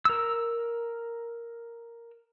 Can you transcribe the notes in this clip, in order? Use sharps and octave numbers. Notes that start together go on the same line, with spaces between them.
A#4 E6